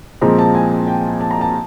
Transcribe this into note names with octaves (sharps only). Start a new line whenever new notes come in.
A#2 F3 G#3 C4 A#5
A5
G#5
G5
A5
A#5
A5